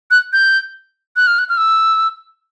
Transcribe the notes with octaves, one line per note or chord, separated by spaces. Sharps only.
F#6
G6
F#6
F6
F#6
F6
E6